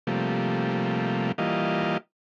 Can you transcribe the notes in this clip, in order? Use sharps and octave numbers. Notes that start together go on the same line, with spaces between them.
C3 F3 G3 A3 A#3
E3 G3 A#3 F4 D#5